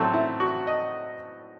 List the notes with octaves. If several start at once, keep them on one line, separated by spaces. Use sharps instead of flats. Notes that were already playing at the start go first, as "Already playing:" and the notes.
Already playing: A2 F#3 A3 C4 A4
E4
F#4
D#5